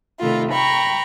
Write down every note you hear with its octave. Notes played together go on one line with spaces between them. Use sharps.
C3 D#3 A3 E4 F4
G5 A#5 B5 C#6